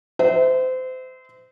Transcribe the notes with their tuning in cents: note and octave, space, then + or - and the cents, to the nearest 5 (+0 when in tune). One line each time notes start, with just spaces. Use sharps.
C5 -30 E5 -25